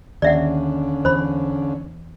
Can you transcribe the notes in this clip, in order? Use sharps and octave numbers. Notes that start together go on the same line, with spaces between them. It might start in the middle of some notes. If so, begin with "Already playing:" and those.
D#2 D3 C#4 D5 E5 F#5
E2 C5 B5